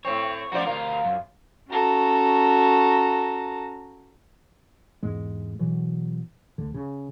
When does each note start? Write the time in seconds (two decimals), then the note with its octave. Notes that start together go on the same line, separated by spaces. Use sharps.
0.05 A2 C4 C#5
0.52 F#2 F3 F#4 C5 D5
0.67 D2 F4 A#4
1.05 F#2
1.71 C#4 F#4 A4 A#5
5.03 E2 G#2 G#3
5.59 B2 E3 F#3
6.58 D2 D3
6.74 C#3